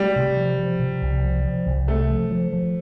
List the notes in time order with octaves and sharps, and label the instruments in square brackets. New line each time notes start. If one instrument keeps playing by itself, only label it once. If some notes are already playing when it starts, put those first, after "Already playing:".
Already playing: [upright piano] G3 [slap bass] A3
[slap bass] C3
F3
F3
C3
C2
F3
F3
C2
[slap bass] C2 [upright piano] A3
[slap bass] F3
F3
F3